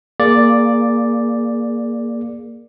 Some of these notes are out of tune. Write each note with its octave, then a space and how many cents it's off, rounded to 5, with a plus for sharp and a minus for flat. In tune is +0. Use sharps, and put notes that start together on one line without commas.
A#3 +0 G#4 +0 D5 +0